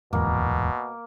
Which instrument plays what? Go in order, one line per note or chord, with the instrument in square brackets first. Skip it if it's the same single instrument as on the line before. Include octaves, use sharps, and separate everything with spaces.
[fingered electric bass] D1 E2 G#2 [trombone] B2 [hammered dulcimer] A#3